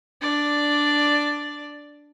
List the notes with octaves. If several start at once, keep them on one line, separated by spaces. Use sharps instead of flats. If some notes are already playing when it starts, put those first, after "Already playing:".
D4 D5